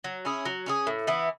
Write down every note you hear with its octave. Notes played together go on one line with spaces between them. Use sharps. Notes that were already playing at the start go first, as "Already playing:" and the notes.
F#3
C#4 E4 G#4
F#3
C#4 E4 G#4
A2
E3 B3 E4